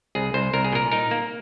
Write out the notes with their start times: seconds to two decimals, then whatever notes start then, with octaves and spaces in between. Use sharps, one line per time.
0.15 C2 G#4
0.34 C2 C5
0.53 C2 A#4
0.64 G#4
0.72 A#2 A#4
0.92 D#4 A#4
1.11 A#3